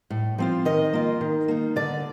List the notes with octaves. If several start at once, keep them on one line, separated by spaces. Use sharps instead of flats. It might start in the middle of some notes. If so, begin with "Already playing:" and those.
A2
F3 C4 F4
D#3 D#5
A#3 F4
D#3
A#3 D#4
D3 D5